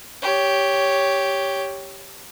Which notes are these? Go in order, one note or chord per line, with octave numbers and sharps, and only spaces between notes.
G4 C#5